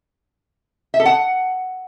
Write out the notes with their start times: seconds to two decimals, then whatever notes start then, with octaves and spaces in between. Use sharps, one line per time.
0.94 E5
1.00 A4
1.05 F#5